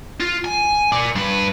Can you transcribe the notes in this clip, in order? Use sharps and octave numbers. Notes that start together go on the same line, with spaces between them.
F4
G#5
A#4 D5
G2 B4